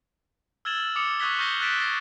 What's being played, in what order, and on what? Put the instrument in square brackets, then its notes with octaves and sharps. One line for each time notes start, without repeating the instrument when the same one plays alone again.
[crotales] E6 F6 G#6 A6 E7 F#7
D6 D#6 C#7
C#6 D#6 F#6 G#6 B6 G7
C#6 F6 G6 A#6 C7 G7
E6 F#6 A6 B6 D7 E7
F#6 A6 A#6 C7